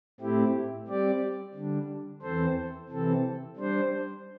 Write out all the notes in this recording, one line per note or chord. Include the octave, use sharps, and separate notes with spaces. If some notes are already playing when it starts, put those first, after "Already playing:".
A2 A3 C4 E4 G4
G3 C4 G4 D5
D3 G3 D4
E2 E3 C4 A4 C5
C3 E3 C4 A4
G3 D4 C5